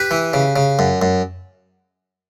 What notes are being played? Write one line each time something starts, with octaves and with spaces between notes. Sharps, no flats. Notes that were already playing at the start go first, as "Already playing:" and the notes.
Already playing: G4 B4
E3
C#3
C#3
F#2
F#2